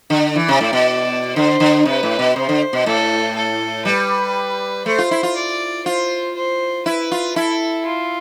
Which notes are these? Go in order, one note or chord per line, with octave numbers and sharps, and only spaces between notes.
D3
E3 D5
C3
A2
B2
D3 C5
D3
C3 B4
A2
B2
C3 C5
D3
B2
A2 A4
A4
G3 B4
A3 C5
F4
E4
F4
D5
F4 C5
C5
E4 B4
F4
E4 A4
F4